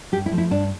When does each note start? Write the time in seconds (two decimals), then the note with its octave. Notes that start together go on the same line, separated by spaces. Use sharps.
0.12 G2 G4
0.26 E4
0.31 F3 A3
0.38 E4
0.51 G2 D4